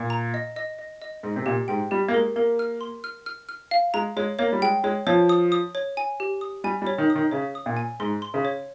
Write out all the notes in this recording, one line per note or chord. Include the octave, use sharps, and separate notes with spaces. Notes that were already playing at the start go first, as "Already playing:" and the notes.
Already playing: A#2
A#5
D#5
D#5
D#5
D#5
G#2 D#5
C3
A#2 G4
G#2 G5
G3 G4
A#3
G#3 A#4
A#3 A#4
F6
C6
F6
F6
F6
F5
G#3 A#5
G#3 C#5
A#3 C#5
G3
G#3 G5
G#3 C#5
F3 C#5
D#6
D#6
C#5
G#5
G4
D#6
G3 G#5
G3
C#5
D#3
D#6
D#3
C#3 C#5
D#6
A#2
G#5
G#2 C6
C6
C#3
C#5